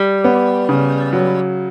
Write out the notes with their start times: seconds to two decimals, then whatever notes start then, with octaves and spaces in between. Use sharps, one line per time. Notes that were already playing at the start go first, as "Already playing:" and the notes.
Already playing: G3
0.24 B3
0.69 C#3
1.13 F#3